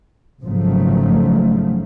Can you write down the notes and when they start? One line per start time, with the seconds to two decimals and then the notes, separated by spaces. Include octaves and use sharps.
0.41 G#1 C#3 F3 F#3 A3